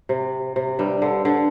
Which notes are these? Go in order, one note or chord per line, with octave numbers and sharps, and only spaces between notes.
C3
C3
G2 G3
D3
D3